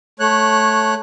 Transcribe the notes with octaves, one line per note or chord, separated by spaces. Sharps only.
A3 C#5 F#6